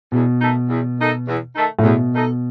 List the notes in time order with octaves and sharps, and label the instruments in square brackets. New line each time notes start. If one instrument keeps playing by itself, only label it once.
[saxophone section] E2 [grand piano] B2
[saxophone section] D#3 A3 D#4 A4
E2
D#3 A3 D#4 A4
E2
D#3 A3 D#4 A4
[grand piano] A2
[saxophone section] E2 [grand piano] B2
[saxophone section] D#3 A3 D#4 A4